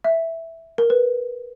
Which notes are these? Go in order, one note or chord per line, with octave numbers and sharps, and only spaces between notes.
E5
A#4
B4